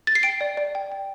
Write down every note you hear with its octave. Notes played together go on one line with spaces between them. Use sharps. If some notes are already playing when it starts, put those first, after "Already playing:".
A6
C7
G5 D7
D5
D5
G5
G5